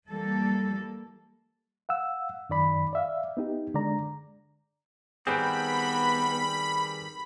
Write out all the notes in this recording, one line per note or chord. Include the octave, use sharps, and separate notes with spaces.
E3 G3 A#3 A4
F5 F#5 E6
F#2 D#3 D5 B5
D5 E5 F5
B3 D#4 G4
D3 G#3 D5 A#5
D#3 G3 B3 C4 G#4 B4 G5 B5